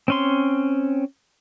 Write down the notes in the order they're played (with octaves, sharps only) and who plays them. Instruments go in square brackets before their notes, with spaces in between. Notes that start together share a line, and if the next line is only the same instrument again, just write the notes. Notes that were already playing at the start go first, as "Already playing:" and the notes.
[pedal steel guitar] C4 C#4 C6